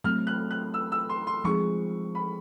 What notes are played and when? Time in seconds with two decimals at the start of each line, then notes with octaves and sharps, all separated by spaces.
0.04 F#3 A3 C4 F6
0.27 F#6
0.51 F#6
0.74 E6
0.92 E6
1.09 C6
1.27 C6
1.44 F3 G#3 C4 D#4 G#4 C#6
2.15 B5